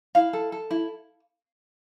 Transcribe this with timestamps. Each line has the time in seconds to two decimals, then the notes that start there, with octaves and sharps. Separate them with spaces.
0.15 E4 F5
0.33 A4
0.52 A4
0.71 E4